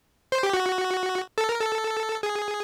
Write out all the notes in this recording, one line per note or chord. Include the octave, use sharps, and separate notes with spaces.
C5
G4
F#4
A4
A#4
A4
G#4